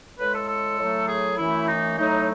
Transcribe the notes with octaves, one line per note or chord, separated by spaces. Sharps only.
A2 G#3 B4
A4
A4
A2 F#3 A3
G#4
F#2 E3 A3 E4
D#4
A2 F#3 A3 D#4